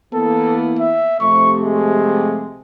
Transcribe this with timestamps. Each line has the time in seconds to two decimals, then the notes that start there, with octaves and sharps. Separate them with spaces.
0.14 E3 A#3 B3 A4
0.79 E5
1.21 C3 F3 A3 C#6
1.58 G#3